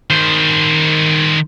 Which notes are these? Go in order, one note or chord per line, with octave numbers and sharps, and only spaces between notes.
D#3 C5